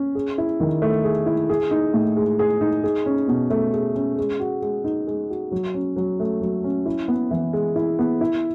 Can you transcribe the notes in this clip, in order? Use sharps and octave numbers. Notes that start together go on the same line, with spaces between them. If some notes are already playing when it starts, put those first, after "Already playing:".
Already playing: C#4
G#4
E4
D#3
A3
G#4
E4
G#4
D#4
A2
G#3
G#4
D#4
G#4
C#4
B2
A3
G#4
C#4
G#3
F#4
G#3
D#4
G#3
F#4
F#3
C#4
F#3
A3
F#3
C#4
E4
B3
E3
G#3
E4
B3
E4